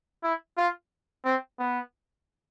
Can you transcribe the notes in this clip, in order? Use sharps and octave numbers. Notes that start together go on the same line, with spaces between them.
E4
F4
C4
B3